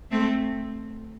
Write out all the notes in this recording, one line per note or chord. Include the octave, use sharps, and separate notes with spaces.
A3 C4